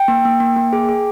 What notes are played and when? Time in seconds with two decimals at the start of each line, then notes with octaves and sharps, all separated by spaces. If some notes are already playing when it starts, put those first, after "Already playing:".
Already playing: G5
0.08 A#3
0.25 A#3
0.40 A#3
0.56 A#3
0.73 G#4
0.89 G#4